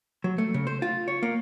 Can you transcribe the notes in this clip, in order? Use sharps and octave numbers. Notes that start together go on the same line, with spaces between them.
F#3
A3
C#3
C5
F4
C#5
A#3